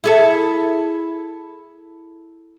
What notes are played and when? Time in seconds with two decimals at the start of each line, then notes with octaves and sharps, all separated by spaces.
0.04 E4 G#4 A4